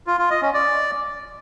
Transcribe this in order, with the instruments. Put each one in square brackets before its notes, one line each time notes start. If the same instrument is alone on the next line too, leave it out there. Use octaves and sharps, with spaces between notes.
[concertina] F4
F4
D#5
C#4
D5